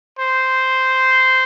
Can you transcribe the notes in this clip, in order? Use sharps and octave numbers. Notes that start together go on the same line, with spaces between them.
C5